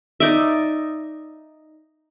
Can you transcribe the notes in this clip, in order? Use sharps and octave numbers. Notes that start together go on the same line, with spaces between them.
D#4 D5 E5